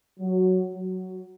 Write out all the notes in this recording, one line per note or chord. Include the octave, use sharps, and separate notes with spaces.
F#3
F#3